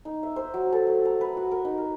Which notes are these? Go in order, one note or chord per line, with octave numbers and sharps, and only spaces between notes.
D#4
E5
C5
F#3
A4
A3
A#5
B4
F#4
A#4
D#4
A#4